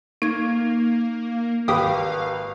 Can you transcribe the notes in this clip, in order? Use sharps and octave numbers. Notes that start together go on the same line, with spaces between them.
A#3 D#4 G#6
G#1 G4 B4 F5 G5 D#6